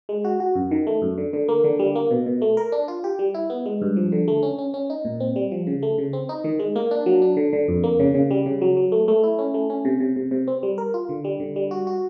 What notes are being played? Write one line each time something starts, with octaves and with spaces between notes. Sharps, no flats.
G#3
F#4
F#4
F#2
D#3
A3
F#2
D3
D3
A#3
D3
G3
A#3
B2
B2
A3
A#4
D4
F4
G4
G3
E4
B3
G#3
G2
F3
D3
A3
C#4
C#4
C#4
D#4
A#2
C4
G3
F3
C#3
A3
C#3
C4
D#4
D#3
G#3
A#3
D4
F#3
D4
D3
D3
F2
A#3
C#3
C#3
G3
C#3
F#3
F#3
A3
A3
E4
C#4
A3
C#4
C3
C3
C3
C3
C4
G3
A#4
F4
D3
G3
D3
G3
F#4
F#4